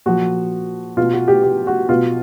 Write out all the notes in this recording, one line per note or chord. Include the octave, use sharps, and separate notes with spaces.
A#2 F3 F#4
B2 F4
F#4
G4
G4
F#4
B2 F4